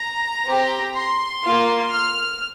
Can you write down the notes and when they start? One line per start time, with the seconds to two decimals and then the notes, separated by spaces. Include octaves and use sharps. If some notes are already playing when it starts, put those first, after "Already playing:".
Already playing: A#5
0.45 C4 G4
0.95 C6
1.43 A#3 F4
1.91 F6